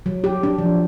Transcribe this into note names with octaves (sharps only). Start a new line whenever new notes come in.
F#3
G4
D4
F3